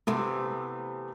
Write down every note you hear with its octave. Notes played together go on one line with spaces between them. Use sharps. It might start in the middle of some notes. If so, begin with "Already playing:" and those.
C3 E3 A3 B3